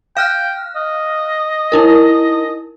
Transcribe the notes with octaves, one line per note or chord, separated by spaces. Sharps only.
F5 G5 F6 F#6
D#5
D#4 E4 A#4